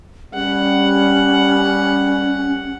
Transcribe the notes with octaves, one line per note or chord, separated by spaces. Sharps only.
G3 C#4 F#5